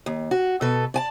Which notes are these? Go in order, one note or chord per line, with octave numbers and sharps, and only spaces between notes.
D#2
F#4
B2 A4 B4
D5 G#5 A5